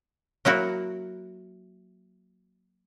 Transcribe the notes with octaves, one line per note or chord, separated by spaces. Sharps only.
F#3 A#3 E4 F#4